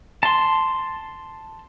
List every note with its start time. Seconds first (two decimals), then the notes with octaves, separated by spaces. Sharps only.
0.23 A5 C6